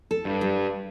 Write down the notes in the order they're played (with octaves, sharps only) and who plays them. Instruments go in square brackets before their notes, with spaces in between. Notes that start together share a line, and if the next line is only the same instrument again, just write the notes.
[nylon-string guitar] A4
[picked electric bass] G2
[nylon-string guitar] G3